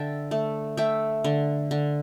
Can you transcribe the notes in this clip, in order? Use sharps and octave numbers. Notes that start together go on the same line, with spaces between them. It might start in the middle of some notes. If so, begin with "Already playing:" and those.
Already playing: D3 E5 G5 A5
A3
A3 E5 G5
D3
D3